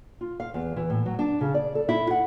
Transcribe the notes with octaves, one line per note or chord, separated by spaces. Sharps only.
F4
F5
E2
E3
A2
F#3
D4
C#3
D5
A4
E4
F#5